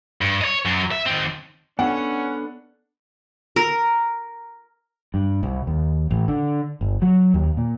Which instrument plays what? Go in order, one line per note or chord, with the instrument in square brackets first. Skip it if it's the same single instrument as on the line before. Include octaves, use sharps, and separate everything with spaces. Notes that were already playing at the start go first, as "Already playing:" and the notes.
[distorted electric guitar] G2
C#5 D#5
F#2 F#3
E5
D#3 C4
[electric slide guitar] B3 D4 A4 [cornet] C#4 [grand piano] F#5
[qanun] A#4
[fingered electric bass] G2
C2
D#2
A1
D3
G1
F#3
D#2
A#2